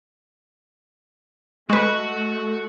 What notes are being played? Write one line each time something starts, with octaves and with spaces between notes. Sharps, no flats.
G#3 A3 F#4 B4 D#5 F#5 C#6